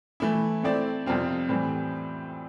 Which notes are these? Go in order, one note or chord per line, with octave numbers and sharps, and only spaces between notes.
E3 A3 E4
A3 C4 E4 A4 D5
F2 C3 G3 C4 F4
A2 E3 G3 C4